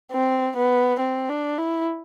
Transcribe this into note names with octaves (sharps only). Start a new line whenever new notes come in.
C4
B3
C4
D4
E4